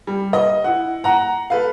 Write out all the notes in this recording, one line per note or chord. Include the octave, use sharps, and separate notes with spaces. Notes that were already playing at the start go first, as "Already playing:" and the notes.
G3
D#5
E4 F#5
F#5 A#5
A4 B4 F5